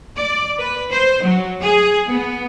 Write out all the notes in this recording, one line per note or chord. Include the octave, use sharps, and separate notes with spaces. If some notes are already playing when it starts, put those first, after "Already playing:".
D5
B4
C5
F#3
G#4
B3